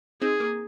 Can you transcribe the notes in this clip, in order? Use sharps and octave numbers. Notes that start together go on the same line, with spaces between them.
C4 D#4 G#4
A#3